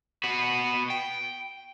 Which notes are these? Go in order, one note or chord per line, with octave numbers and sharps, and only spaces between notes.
B3 F#4
G5